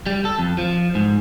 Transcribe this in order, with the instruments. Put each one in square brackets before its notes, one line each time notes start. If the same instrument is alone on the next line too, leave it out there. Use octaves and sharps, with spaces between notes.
[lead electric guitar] G3
A4
F2
F3
G#2